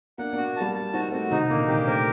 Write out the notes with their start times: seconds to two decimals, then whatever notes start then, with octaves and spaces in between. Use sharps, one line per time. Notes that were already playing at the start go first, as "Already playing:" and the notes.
0.18 A#3 D4 F#5
0.33 A#3 D4 F#4
0.56 G3 A#3 A5
0.75 A5
0.93 C4 D#4 F#4
1.12 A3 C4 F#4
1.30 C3 D#3 D#4
1.50 A#2 D3 A#3
1.68 C3 D#3 G4
1.78 D4
1.87 A3 C4 A#4